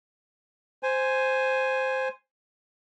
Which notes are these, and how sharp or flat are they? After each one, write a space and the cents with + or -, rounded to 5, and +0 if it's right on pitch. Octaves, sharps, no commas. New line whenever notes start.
C5 +0 G#5 +0